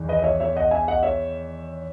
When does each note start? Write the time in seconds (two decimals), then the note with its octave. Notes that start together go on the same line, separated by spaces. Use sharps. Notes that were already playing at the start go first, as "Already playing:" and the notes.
Already playing: E2 D#3
0.08 B4 D#5
0.19 D#5
0.24 C#5 E5
0.40 C#5 E5
0.56 D#5 F#5
0.71 E5 G#5
0.88 D#5 F#5
1.03 C#5 E5